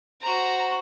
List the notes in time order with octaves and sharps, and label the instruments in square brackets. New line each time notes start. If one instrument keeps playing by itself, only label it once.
[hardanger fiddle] F#4 C5 [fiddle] A#5